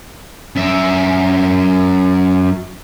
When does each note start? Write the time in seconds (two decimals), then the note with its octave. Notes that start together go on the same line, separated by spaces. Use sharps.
0.56 F#2 E5